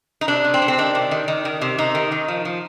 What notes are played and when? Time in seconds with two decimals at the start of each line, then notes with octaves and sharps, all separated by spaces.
0.21 D#4
0.28 C3 D4
0.45 C3
0.54 C4
0.62 C3
0.68 C4
0.78 D#3 D4
0.95 C3
1.11 D#3
1.28 D#3
1.45 D#3
1.61 C3
1.78 C3 D#4
1.95 D#3
2.12 D#3
2.28 F3
2.45 F3